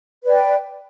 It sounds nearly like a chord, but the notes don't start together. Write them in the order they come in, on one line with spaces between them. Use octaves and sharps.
B4 D5 G5